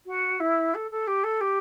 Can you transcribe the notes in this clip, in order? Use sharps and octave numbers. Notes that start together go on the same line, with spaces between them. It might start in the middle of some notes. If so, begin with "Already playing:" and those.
F#4
E4
A4
A4
G4
A4
G4